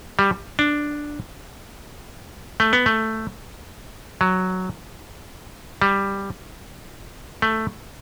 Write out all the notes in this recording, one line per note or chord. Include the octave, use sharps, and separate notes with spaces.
G3
D4
A3
B3
A3
F#3
G3
A3